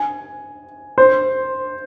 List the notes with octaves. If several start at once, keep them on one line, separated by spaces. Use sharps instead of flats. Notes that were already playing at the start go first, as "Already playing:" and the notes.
Already playing: G#5
C5